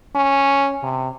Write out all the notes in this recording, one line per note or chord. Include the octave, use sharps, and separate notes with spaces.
C#4
C3